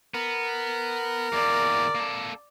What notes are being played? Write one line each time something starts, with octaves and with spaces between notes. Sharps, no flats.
B3 A#4
E2 A#3 D5
A#3 A4